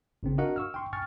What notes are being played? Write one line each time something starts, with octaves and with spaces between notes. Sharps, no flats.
G#1 C#3 C4
D4 F#4 A#4 D#5 F5 F#5
C#6 E6 F6
G5 C6 C#6
G5 G#5 C#6 F6 A6